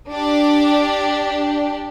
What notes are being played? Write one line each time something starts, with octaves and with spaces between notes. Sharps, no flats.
D4 G4 D6